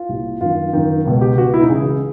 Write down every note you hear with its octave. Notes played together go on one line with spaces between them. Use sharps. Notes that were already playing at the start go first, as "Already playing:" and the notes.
Already playing: F4
C2 A#2
F#2 D#3 F4
F#2 D#3
C#2 B2
G4
C#2 B2 F#4
E4
D#4
C#2 C#3 E3 G#4